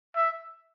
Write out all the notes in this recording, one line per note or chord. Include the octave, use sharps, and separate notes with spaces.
E5